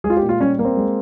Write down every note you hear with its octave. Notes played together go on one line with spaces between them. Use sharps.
G#3 G#4
F4
G4
A#2
F4
G3 C#4
A#3
C4
G#3